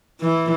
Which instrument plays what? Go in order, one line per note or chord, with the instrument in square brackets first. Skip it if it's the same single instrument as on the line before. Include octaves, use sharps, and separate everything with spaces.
[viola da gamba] E3